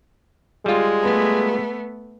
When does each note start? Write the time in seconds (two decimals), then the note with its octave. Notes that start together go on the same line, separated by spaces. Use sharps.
0.66 G3 G#3 F4
1.02 A3 B3